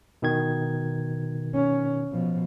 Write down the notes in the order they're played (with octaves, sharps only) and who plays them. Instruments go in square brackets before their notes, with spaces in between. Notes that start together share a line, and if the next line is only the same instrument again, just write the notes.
[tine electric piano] B2 D#3 G#6
[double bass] C#4
B2 F3